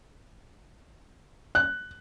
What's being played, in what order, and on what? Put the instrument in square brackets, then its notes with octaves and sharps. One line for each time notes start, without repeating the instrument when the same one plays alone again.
[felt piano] F#6